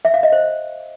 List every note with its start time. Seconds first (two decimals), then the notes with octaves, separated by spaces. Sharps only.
0.05 E5
0.14 F5
0.23 D#5
0.32 C5